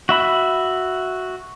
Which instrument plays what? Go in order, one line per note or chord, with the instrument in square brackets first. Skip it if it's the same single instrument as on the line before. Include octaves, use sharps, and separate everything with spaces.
[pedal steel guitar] F#4 E5 B5